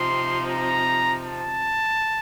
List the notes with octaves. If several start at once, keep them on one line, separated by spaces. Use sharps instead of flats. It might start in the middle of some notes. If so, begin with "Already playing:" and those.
Already playing: C3 F3 C4 D#4 C6
A#5
A5